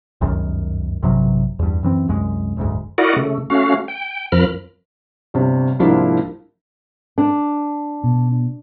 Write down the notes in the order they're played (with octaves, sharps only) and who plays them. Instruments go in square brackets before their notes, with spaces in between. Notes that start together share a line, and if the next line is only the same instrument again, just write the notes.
[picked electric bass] G1 C#2 F#2 D#3
A1 G2 C3 F#3
E2 G2
F#2 E3 C4
C2 F#2 G#3
F#1 D2 G#2
[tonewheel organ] E4 F#4 A#4 D5 D#5 F#5
C#3 A3
A3 C#4 F#4 F5
G5
F2 F3 A#4 B5 F6
[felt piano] G1 G2 C3
C2 G#2 F3 A#3 D4 E4
[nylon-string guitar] D4
[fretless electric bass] B2